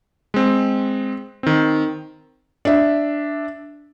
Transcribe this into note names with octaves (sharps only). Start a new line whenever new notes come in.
G#3 C4
D#3 C4
D4 E5